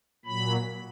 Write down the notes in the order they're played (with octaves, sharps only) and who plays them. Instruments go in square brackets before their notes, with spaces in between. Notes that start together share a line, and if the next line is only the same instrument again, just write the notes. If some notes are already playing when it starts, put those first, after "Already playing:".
[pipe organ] A#2 F#3 B5